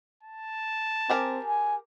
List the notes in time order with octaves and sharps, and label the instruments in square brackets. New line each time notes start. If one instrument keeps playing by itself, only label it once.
[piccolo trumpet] A5
[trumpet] C4 [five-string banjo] G4 G#4 A#4
[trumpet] G#5